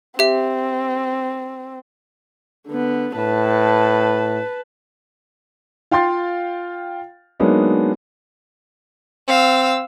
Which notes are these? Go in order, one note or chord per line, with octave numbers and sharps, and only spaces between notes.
C4 G4 E5
D3 B3
A2 B4 A5
F4 F5 G5 C6 A6
F#3 G#3 A#3 B3 D4 D#4
C4 F5 E6